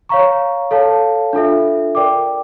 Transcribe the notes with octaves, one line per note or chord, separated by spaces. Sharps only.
C#5 F5 A#5 C#6
A4 C#5 F5 A5
D4 F4 A4 E5
A#4 D5 G5 D6